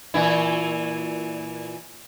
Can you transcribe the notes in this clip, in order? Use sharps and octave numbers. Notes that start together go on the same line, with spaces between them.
A#2 E3 E4